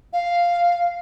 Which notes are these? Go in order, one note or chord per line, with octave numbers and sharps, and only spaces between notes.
F5